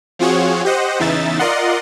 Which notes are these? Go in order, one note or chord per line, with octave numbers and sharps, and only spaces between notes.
F3 C4 F4 F#4 G#4 C#5
G4 C5 D#5 F#5
E2 C#3 E3 D#4 E5 A6
F4 A#4 D5 D#5 F#5 C6